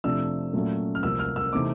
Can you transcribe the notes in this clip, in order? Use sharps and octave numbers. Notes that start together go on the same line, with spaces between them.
F2 C3 F3 A3 D4 E6
A#2 F#3 A3 C#4
F6
C2 C3 F3 A#3 E6
F6
E6
C3 E3 A3 C4 D#4 D6